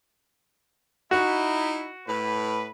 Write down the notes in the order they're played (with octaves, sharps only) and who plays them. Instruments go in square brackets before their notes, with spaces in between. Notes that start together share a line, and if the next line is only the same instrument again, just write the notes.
[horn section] D#4 E4 [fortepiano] F#4
[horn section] A2 B4